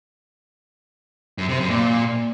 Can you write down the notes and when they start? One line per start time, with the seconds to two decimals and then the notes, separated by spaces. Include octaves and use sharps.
1.38 F#2
1.49 C3
1.59 F#2
1.70 A#2